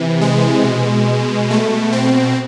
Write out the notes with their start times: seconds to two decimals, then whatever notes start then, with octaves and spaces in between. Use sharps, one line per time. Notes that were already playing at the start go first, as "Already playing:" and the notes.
Already playing: C3 E3
0.21 G#3
0.64 B2
1.51 A3
1.93 C4